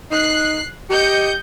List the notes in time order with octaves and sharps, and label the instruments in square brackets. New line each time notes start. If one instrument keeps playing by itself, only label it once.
[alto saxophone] D#4 [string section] F#6 C7
[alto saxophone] G4 [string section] D#5 G6 C#7